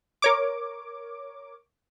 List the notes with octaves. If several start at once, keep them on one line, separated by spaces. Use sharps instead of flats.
A#4 C#5 D6